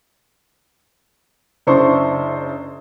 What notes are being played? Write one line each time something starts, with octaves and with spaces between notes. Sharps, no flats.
F#1 D4 E4 C5 C6 C#6